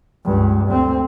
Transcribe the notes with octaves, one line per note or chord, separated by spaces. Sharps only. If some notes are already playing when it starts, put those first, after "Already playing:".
C#2 G2
D2 C4